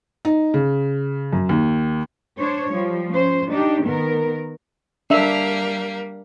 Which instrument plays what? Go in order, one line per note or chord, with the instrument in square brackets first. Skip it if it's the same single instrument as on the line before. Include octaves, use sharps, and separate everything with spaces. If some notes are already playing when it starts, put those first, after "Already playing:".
[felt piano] D#4
C#3
F#2
D#2
[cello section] D4 C5 C#5
F3 G3
C#4 C5
D4 D#4 G4
D#3 B3 A#4
[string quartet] G3 A#3 [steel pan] D4 E5